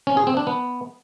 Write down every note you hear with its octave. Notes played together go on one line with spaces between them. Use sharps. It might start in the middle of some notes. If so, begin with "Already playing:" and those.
C#4
G#4
C4
D4
B3